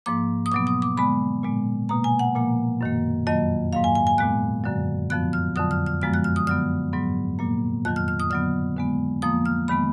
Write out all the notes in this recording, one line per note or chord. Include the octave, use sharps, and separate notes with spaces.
G#2 F3 A#3 D6
D#6
B2 F#3 B3 D6
D#6
D6
D3 G#3 B3 B5
A#2 G#3 B3
B2 A#3 A#5
G#5
F#5
A#2 F3 A#3
F#2 D#3 A#3
F2 D#3 F#3 A#3 D#5
G#2 F#3 A#3 F5
G#5
G#5
G#5
A#2 G#3 B3 F#6
F#2 D3 F#3
F2 F3 B3 F#6
F6
F2 D3 F#3 D#6
F6
F6
F#2 F3 G#3 B3 F6
F#6
F6
D#6
D3 F#3 B3 F6
G#2 F#3 B3
A#2 F#3 A#3
F2 D#3 F#3 F#6
F6
F6
D#6
D3 F#3 B3 F6
D3 G#3 B3
F2 F3 A#3 D#6
F6
D#3 G#3 B3 B5